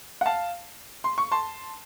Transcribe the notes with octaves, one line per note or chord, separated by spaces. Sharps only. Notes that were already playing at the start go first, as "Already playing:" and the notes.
F#5
F5 A5
C6
C#6
A5 C6